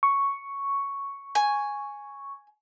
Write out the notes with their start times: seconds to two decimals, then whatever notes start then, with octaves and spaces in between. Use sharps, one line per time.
0.03 C#6
1.35 G#5